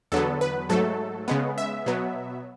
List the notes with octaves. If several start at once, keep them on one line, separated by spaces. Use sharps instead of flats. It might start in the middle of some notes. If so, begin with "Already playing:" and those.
E2 D3 F#3 B3 A4
B4
G#2 F#3 A3 A4
C#3 G#3 B3
E5
B2 F#3 B3